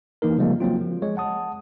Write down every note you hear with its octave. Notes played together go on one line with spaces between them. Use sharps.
E3 A#3 D#4 A#4
C#3 F3 G3 G#3 A#3 C4
F#3 A#3 C4 F4
F3
G#3 C#5
F#5 A5 D#6